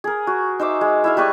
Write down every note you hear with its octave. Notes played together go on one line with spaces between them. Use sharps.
G#4 A#4
F#4
D#4 C5 E5 D6
G#3
E4 E5 F5
G3 B4 C#6 D#6